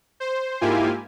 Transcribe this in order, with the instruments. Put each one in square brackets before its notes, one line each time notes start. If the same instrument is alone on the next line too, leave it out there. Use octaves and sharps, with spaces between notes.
[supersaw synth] C5
G#2 A#3 E4 F4 G4 G#5